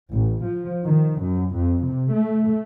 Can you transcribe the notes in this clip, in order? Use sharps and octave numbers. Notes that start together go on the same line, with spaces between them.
A1
F3
D#3
F#2
F2
C3
A3